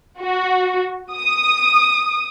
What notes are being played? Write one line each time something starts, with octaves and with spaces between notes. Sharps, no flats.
F#4
D#6